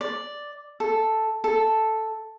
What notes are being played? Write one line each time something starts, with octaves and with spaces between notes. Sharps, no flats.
D5
A4
A4